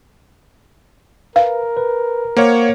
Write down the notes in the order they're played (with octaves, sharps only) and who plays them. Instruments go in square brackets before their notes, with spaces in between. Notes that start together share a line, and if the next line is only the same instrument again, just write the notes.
[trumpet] A#4 [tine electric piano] B4 [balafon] F5
[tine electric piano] B4
[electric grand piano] A#3 C#5 [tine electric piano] C5 F5 F#5